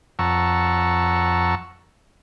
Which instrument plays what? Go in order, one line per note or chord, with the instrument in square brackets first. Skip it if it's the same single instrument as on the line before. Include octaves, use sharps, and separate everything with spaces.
[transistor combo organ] F2 F#5 A5 A#5 C#6 E6